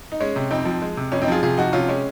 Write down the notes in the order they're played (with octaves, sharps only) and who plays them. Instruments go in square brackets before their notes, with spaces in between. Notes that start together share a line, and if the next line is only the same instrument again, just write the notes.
[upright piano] D#4
G#3 C#4
C3
F2 C4 D#4
F3
G#3
C3
F2 C#4
C4 D#4
F3 F4 G#4
C3 F4 G#4
F3 D#4 F#4
C3 C#4 F4
G#3 C#4